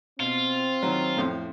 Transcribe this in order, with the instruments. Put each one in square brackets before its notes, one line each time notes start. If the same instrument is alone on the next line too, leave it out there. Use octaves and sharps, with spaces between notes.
[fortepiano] B2 [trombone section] C4 [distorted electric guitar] F4
[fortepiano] D#3 F#3
F2 A2 C6